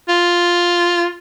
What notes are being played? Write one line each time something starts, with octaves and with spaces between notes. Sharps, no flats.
F4